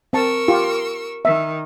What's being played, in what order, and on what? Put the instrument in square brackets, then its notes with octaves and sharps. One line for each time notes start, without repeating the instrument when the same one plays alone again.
[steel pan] C4 A5 [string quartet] A#4 C#6 E6
[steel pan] F4 G4
[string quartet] D#3 [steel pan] E5